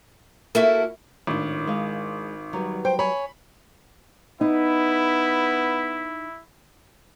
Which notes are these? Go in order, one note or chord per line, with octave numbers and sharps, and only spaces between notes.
A#3 E4 F#4 A4 E5
G#1 A2 D4
G#3 F5
F#3 G3 B4
C5 G5
C#5 G#5 B5
B3 D#4 E4